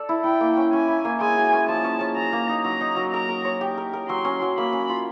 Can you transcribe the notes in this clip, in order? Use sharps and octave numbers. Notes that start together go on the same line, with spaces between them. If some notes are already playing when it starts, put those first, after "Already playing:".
Already playing: A4 D5
E4
E4 G5
A#3
C#4
C#4 G#5
E4
A#3
G#3 G#5
F#4
C#4
F3 A5
C#4
C#4
F#3 A#5
A#3
D#4
F#3 A#5
D#4
F#3
A#4 A#5
A#4
C#5
G4
A#4
A#4
F#3 C6
C#4
F#3
A#3 B5
C#4
F4